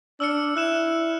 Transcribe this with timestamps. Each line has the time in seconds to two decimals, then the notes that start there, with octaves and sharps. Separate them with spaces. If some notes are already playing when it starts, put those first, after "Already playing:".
0.20 D4 E6 F6 C#7
0.56 E4 E6 F#6 E7